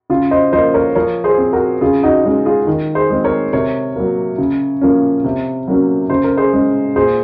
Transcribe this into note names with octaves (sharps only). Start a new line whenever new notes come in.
C#3 F4
C5 D#5
F3 A#3 C5 D#5
A#4 C#5
F3 A#4 C#5
G#4 C5
C4
F#4 A#4
C#3 F4 G#4
D#4 F#4
G#3 C#4
F4 G#4
D#3
G#4 C5
G#3 C4
A#4 C#5
C3 A#4 C#5
F#3 A#3
C#3
F3 A#3 C#4
C3
F#3 A#3 C#4
C#3 C5
A#4
G#4 C5
G#3 C#4
A#2 G#4 C5